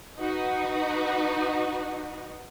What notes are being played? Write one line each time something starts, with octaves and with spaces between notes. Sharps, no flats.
D#4 F#4 B4